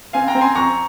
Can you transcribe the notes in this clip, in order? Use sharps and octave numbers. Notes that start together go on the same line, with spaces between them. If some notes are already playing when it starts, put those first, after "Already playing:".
C4 F5 G#5
G5 A#5
C4
G#5 C6
F2 A#5 C#6